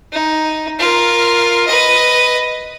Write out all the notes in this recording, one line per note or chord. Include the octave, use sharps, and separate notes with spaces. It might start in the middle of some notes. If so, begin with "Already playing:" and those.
D#4
F4 A#4
B4 D#5